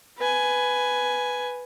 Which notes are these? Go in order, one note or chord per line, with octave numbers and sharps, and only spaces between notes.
B4 G#5